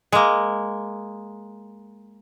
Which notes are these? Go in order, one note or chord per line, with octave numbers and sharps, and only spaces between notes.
G#3 A#3